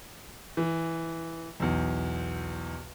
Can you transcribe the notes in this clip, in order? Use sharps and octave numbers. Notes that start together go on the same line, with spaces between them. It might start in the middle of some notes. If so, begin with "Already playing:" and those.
E3
B1 E2